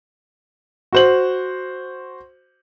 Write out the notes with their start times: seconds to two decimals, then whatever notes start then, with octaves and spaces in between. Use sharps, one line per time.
0.93 F#4 C5 F#7